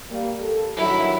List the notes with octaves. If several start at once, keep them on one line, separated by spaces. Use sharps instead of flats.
G3 A#3
A4
G2 D#3 F#3 E4